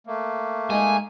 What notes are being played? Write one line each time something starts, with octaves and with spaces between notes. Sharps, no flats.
A3 A#3
G#3 D#4 G#5